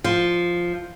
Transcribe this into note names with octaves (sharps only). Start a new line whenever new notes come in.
F3